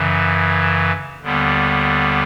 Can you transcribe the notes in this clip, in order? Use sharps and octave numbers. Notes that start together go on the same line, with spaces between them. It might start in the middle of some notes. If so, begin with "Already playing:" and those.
Already playing: F#2 C#3 E3
D#2 D3 G3 B3